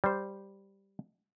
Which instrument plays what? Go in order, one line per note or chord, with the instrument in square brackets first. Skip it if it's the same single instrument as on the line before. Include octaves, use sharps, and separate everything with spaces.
[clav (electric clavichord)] G3 C5